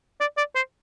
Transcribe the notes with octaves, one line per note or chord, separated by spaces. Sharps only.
D5
D5
C5